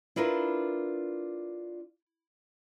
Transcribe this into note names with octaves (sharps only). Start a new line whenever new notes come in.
D4 E4 F4 A#4 B4